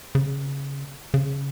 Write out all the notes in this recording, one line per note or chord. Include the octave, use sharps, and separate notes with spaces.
C#3
C#3